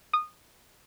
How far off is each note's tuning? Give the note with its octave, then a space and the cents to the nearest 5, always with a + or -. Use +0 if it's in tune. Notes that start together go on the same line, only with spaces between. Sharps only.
D#6 -20